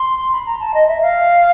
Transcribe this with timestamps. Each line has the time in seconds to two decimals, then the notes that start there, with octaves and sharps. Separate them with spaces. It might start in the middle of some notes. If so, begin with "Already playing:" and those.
Already playing: C6
0.32 B5
0.46 A#5
0.59 A5
0.74 D#5
0.88 E5
1.01 F5